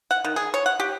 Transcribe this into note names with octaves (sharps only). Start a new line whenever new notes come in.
F#5
D#3
G#4
C#5
F#5
G4